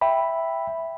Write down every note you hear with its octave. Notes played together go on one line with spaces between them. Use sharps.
E5 G5 B5